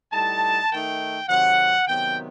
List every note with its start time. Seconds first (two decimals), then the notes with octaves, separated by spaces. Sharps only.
0.13 A2 G3 D#4 A5
0.71 D#3 A3 D#4 G5
1.29 C3 D#3 F#3 F#5
1.87 C3 D#3 F#3 B3 G5